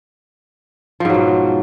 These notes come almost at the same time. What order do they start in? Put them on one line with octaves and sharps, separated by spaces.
F3 G#2 F#3 B2